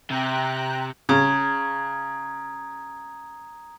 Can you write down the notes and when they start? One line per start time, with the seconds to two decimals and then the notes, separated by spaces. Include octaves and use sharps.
0.11 C3 G5 A#5 F#6
1.09 C#3 A#5 D#6 G#6